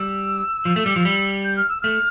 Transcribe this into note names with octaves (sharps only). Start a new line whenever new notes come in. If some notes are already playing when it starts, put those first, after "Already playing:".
Already playing: G3 E6
F3
A3
G3
F3
G3
G6
F6
E6
A3 F6